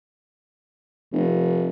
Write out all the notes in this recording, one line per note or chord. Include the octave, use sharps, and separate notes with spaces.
F1